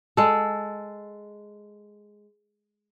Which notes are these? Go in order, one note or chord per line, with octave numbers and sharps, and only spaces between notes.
G#3 A4